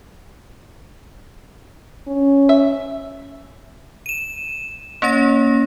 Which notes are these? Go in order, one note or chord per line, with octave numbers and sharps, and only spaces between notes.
C#4
E5
D#7 E7
A#3 C#4 C#5 A#6